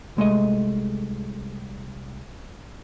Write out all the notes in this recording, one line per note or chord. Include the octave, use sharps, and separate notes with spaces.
C2 G#3 A3 D#5